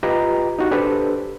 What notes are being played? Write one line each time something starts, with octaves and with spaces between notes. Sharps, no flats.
F4 G4 B4 D#5 G5 A#5
D#4 F#4 G4
D4 G4 A4 B4 C5